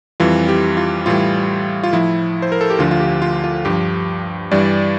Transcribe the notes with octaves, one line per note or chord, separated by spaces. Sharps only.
F2 E3 G3 F4
G4
F4
A2 E3 G3 F4
F4
A2 F3 E4
C5
A#4
A4
G4
D2 D3 F3 F4
F4
G4
F4
F4
G2 F3 G4
G2 E3 G3 D5